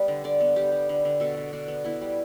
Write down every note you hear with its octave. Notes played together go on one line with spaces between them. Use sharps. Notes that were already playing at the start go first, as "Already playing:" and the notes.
Already playing: G3 B3
D3
D3 D5
B3
G3 G4
G3
D3
D3
B2 A4
B2
B2 D4
B3
B3 E4
G3